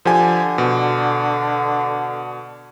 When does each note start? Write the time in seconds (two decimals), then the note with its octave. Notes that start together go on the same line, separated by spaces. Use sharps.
0.05 D3 F3 G4 G#5
0.58 B2